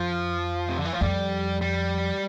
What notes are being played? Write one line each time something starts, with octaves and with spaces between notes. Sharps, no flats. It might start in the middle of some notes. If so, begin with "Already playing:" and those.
Already playing: F2 F3
C3
D3
E3
F3
F2 G3
G3